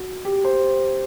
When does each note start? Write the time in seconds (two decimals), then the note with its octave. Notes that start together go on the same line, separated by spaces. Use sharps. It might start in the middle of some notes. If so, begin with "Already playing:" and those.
Already playing: F#4
0.25 G4
0.44 C5